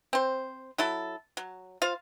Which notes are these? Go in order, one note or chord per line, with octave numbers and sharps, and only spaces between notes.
C4 C5
F#3 E4 A4
F#3
F4 C5 F5